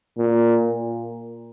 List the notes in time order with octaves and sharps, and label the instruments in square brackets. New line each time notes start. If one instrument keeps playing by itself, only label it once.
[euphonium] A#2